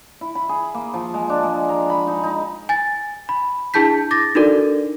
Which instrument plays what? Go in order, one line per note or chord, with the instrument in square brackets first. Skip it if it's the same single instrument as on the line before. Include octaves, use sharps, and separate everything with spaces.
[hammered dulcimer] E4
B5
G#4
A#3
F3
G#3
D4
G#3
A#5
B5
D#4
D#4
[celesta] G#5 A6
B5
D4 E4 G#4 A5 G6 B6
D6 A6 A#6
D4 D#4 F#4 A4 A#4 D5